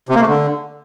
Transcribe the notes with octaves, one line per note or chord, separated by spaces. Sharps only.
C3
A#3
A3
D3